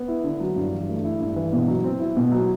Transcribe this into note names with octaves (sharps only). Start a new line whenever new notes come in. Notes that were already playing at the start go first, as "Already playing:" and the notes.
Already playing: B3
E4
D3
F#3
G2
E3
A3
E4
G2
E3
B2
F#3
C4
E4
B2
F#3